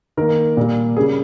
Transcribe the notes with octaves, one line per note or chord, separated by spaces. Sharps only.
D#3 A#3 A#4
A#2 G3 A#3
C#3 G3 A#3 G#4